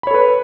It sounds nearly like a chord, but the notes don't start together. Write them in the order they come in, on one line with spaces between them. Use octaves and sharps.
B5 C#5 A4 B4